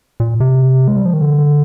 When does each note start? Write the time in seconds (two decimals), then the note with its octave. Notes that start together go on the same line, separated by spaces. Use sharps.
0.20 A#2
0.40 C3
0.88 G#3
0.97 G3
1.06 F3
1.13 D#3
1.21 D3